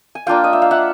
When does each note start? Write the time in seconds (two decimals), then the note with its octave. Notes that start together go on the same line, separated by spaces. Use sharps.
0.15 G#5
0.27 A#3 D4 F4 F5 G5
0.44 D#5
0.53 E5
0.62 F5
0.71 E5 F#5